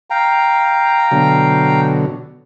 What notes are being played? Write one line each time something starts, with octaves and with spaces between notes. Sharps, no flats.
F5 G5 A#5
B2 D3 F#3